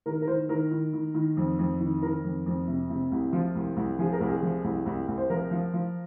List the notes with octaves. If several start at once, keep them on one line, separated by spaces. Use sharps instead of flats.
D#3 A#4
A#4
D#3 C5
D#3 A#4
D#3
D#3
D#3
F2
F2
D#3
D#3 A#4
F2
F2
C3
C3
C2
F3 F4
C2
C2
F3 G#4
A#4
C2
G#4
F3
C2
C2
C2
C5
F3 A#4
F3
F3